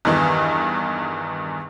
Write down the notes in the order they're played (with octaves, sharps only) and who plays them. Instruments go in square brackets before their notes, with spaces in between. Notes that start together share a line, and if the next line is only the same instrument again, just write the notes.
[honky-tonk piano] E2 G2 D#3 E3